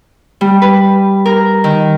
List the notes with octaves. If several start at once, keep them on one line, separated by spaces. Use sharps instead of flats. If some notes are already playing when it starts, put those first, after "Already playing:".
G3
B4
A#4
D#3